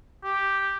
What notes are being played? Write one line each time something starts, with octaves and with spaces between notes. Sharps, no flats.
G4